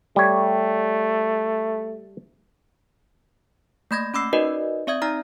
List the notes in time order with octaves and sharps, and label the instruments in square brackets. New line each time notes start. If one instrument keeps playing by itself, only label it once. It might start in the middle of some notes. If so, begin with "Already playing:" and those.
[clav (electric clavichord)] G3 C#5 [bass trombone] A3
[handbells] A3 A#3 B5 G6 G#6 A#6
C#4 B5 D6 E6 C7
D#4 F#4 A#4 B4 D5 D#5
C4 D5 E5 D#6 G#6
D#4 D5 A#5 F6 A#6